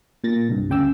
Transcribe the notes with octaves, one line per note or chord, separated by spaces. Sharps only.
A#2 A6 A#6
C2 G2
D2 C#3 G5 D6 E6